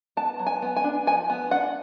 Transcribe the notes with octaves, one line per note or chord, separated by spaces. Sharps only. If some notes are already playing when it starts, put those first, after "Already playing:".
B3 A5
F#3
G#5
B3
G#5
D4
F3 G#5
B3
D4 F#5